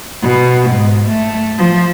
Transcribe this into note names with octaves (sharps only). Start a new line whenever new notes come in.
B2
G#2
A3
F3